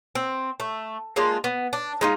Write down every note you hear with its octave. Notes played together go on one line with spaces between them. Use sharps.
C4
A3
G#3 A#3 D4 F4
B3
D4
G#3 D#4 F4